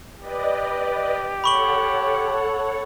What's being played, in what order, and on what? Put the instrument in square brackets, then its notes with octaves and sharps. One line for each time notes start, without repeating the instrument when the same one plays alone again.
[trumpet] G4 [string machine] B4 D5 D#5
[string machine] A4 C#5 F#5 [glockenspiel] B5 C#6 F#7